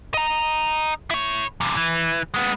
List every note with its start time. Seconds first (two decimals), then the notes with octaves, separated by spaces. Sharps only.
0.14 D#5 A#5
1.10 E4 C#5
1.61 F#2 C3
1.77 E3
2.34 G#3 B3